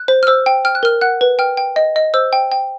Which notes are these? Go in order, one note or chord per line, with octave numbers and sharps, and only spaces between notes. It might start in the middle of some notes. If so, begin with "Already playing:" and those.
Already playing: F#6
C5
F6
C5 E6
G5
G5 F6
F#6
A#4 F6
F#5 F#6
B4
G5 F6
G5
D#5
D#5
C5 E6
G5
G5